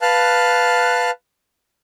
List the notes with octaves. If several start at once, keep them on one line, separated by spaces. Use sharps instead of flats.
B4 F5 A5 F6 F#6